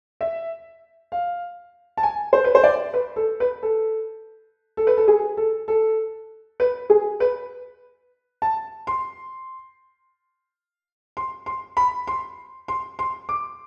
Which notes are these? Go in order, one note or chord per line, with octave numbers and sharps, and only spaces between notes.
E5
F5
A5
G#5
C5
B4
C5
D5
B4
A4
B4
A4
A4
B4
A4
G#4
A4
A4
B4
G#4
B4
A5
C6
C6
C6
B5
C6
C6
C6
D6